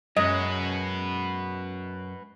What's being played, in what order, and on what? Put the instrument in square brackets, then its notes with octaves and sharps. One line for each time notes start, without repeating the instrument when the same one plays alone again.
[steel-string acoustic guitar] F#2 [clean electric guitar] G#3 C#4 [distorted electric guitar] F#4 B4 [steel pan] D#5